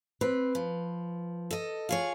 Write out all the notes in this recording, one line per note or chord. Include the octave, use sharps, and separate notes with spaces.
C4 B4
F3
A4 D#5
F4 G#4 C#5